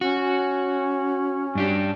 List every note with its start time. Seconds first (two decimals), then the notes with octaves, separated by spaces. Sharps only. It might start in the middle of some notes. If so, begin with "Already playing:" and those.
0.01 C#4 F#4
1.55 G2 D4 G4